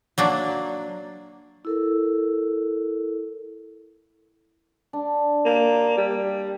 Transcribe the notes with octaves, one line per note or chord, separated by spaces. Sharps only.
F#3 A#3 D4
E4 A4 A#4
D4
A#3
G3